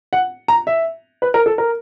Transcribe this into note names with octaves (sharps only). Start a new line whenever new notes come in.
F#5
A#5
E5
B4
A#4
A4
A#4